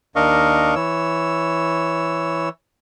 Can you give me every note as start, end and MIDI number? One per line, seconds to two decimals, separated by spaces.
0.16 0.75 39
0.16 0.75 62
0.16 0.75 70
0.16 0.75 75
0.16 0.75 77
0.16 0.75 85
0.75 2.49 52
0.75 2.49 73
0.75 2.49 88